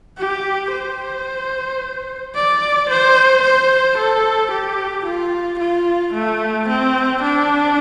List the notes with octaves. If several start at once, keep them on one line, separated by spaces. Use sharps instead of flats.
G4
C5
D5
C5
C5
A4
G4
F4
F4
A3
C4
D4